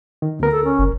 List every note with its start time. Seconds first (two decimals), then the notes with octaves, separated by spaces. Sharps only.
0.22 D#3
0.40 D2 B3 A#4
0.51 A4
0.65 C#4
0.79 F#1